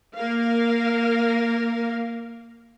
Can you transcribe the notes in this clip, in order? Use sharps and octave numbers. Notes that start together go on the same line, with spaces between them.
A#3 A#4 F5